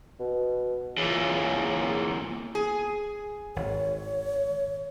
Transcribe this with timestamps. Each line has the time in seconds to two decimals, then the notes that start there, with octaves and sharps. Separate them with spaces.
0.20 B2
0.97 E2 A#2 C#3
2.55 G#4
3.56 G#1 C#5